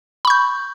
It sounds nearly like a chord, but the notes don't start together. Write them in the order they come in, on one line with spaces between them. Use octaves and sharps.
B5 C#6 G6